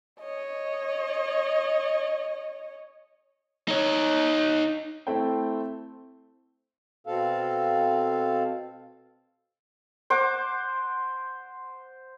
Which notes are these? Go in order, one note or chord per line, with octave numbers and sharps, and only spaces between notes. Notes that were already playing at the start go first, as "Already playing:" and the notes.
C#5 D#5
D#4 C#5
A3 C4 E4 A4 C5 G5
B2 C4 A4 F5
C5 F#5 D6